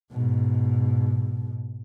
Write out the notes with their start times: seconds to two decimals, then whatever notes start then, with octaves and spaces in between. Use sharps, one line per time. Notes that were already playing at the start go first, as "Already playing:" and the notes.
0.11 G#2 B2